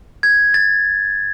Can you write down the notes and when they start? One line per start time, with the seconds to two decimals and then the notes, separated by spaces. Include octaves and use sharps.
0.23 G#6
0.54 A6